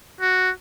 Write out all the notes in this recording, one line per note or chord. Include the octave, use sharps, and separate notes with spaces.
F#4